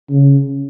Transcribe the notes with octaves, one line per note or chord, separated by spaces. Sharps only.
C#3